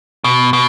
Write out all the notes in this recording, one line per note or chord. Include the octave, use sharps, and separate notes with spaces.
B2
B2